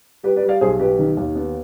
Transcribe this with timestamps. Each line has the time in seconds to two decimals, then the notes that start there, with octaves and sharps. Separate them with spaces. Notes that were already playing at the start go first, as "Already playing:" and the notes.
0.23 G3 G4 B4
0.36 B4 D5
0.43 G3
0.48 D5 F5
0.61 B1 G#4 C5
0.80 B2 G4 B4
0.99 D#3
1.17 D#2
1.35 B3